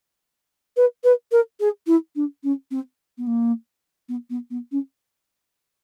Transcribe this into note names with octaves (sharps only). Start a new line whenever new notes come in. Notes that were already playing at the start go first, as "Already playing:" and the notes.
B4
B4
A#4
G#4
E4
D4
C#4
C4
B3
A#3
B3
B3
B3
C#4